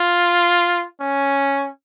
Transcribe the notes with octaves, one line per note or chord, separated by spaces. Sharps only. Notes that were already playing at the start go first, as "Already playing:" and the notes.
Already playing: F4
C#4